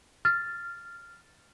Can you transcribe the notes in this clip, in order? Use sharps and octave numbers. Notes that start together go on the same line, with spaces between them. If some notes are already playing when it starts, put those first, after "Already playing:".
F6 A6